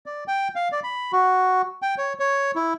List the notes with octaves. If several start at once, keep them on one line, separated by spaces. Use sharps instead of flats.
D5
G5
F5
D5
B5
F#4
G5
C#5
C#5
E4